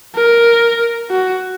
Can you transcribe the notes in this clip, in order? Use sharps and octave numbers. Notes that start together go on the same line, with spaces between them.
A#4
F#4